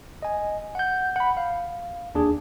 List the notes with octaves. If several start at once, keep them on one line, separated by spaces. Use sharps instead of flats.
D#5 G#5
F#5 G6
F#5 B5
F5
D#2 D4 G#4